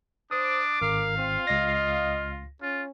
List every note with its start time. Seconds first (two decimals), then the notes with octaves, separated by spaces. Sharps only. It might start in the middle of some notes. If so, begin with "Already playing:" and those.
0.31 D4 C5 D6 D#6
0.82 G#1 A#4 F5
1.17 C4 F4
1.47 C#2 D#5 A#6
2.62 C#4 F4